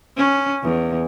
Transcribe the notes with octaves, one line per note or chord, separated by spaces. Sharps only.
C#4
E2